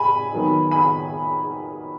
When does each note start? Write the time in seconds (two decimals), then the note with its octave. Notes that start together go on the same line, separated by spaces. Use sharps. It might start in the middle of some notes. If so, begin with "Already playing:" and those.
Already playing: G#5 B5
0.32 D#3 F#3 B3 D#4
0.71 G#5 B5